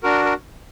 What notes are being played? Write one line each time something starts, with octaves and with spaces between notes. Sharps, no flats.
D4 F#4 A#4
A#4